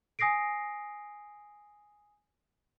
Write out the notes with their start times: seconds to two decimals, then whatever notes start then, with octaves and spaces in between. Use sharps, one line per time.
0.19 G#5 D#6 A#6 C7 D7